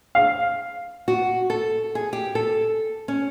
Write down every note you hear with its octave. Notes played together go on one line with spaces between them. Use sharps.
F5
F#4
A4
G#4
G4
A4
C#4